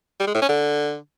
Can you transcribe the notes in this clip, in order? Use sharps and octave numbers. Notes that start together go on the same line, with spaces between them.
G3
G#3
A2
C#4
D3